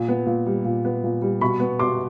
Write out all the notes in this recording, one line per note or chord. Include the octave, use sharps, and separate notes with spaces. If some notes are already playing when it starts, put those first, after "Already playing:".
Already playing: A#2
B3
A#2
G3
A#2
B3
A#2
G3
B2 B5 C#6
B3
B2 C6 D6